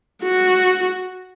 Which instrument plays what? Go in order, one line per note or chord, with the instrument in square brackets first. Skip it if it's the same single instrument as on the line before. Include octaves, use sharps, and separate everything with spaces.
[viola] F#4